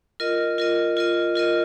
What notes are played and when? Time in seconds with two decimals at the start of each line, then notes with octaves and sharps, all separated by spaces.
0.20 F4 A#4 D#5
0.58 F4 A#4 D#5
0.97 F4 A#4 D#5
1.36 F4 A#4 D#5